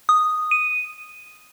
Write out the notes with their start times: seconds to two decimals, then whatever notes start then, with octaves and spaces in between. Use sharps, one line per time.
0.09 D#6
0.51 D#7